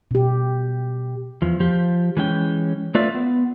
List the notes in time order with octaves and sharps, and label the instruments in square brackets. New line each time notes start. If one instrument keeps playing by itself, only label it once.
[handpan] B2 G4
[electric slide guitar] E2 F3
F3 G4
E3 G#3 C#4 G5
A3 F4 B4 D5 E5
B3